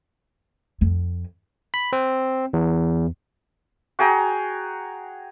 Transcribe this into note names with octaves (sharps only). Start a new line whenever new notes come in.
F2
B5
C4
E2
F#4 G#4 G5 A#5